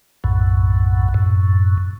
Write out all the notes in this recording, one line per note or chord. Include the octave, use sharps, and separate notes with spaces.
B1 F#2 A2
F#2 A2